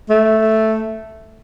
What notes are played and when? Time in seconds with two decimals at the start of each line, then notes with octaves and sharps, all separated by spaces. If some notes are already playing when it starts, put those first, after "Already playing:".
0.09 A3